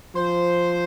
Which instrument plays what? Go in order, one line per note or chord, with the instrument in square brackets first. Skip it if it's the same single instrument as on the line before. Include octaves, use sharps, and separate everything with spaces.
[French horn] F3 [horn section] C5